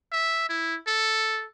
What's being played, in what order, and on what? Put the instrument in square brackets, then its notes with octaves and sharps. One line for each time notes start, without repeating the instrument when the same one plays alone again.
[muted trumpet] E5
E4
A4